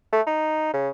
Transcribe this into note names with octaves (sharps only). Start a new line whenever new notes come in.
A3
D#4
C#3